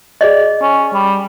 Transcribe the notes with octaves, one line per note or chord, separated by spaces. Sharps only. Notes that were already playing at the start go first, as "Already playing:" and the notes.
G#4 D5 D#5
C#4
G3